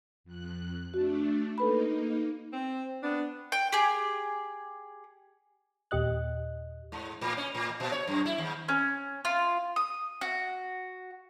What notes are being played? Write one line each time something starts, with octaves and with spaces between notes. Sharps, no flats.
F2 F#6
A3 D4 F#4
A#3 D#4 A4 B4 B5
C4
B3 D4
G5
G4 G#4
D#2 A#2 G4 D#5 F#6
G#2
A2
C#4
A2
A#2
C#5
F#2
E4
D#2
C#4
F4
D#6
F#4